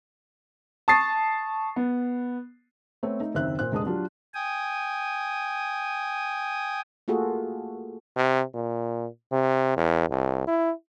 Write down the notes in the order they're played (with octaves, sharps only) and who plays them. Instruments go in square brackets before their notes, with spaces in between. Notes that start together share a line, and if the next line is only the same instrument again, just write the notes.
[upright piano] A5 C#6 D#6 A6 C7
B3
[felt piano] A3 B3 C4 C5 C#5
A3 D#4
F#1 D#2 C4 E5 F#6
A#2 C5 F#6
F1 G#3 D4 D#6
F#3 D4 F4 G4
[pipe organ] G5 G#5 D#6
[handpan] A3 A#3 F4 F#4 G#4 A4
[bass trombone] C3
A#2
C3
E2
C2
E4